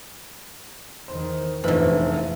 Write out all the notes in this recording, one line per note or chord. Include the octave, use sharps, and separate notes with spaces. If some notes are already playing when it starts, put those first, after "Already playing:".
E2 D#3 C5
F1 A#1 E3 F3 B4 C5 D#5 B5